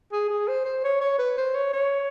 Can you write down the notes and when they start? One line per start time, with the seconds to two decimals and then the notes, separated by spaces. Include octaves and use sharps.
0.12 G#4
0.29 G#4
0.48 C5
0.65 C5
0.84 C#5
1.01 C#5
1.19 B4
1.37 C5
1.55 C#5
1.73 C#5